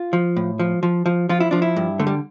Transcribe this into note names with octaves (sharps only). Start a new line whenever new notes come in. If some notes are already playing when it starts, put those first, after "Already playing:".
Already playing: F4
F3
A2
F3
F3
F3
F3 F4
E4
F3 D4
E4
G2
D3 A3
G3